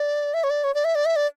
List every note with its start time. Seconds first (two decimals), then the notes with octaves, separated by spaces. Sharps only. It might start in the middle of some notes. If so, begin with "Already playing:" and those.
Already playing: D5
0.34 E5
0.43 C#5
0.50 D5
0.64 C#5
0.74 D5
0.84 E5
0.95 D5
1.05 E5
1.16 D5